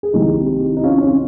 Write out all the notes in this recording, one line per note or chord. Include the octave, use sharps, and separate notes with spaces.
G#4
C2 C3 D#3 D#4 G4
D#4
C#4 F4
C#4